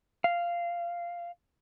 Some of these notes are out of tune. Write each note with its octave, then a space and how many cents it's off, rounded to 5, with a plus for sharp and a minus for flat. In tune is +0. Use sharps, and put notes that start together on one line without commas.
F5 -10